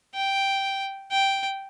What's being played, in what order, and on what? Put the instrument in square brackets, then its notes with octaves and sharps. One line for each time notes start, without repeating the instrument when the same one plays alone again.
[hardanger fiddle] G5
G5